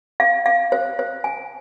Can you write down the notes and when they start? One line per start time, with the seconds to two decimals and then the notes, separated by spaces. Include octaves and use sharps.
0.20 F5
0.46 F5
0.72 C5
0.99 C5
1.24 G#5